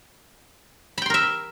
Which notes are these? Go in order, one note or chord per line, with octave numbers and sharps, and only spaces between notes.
A#4 E5 G5 B5 C6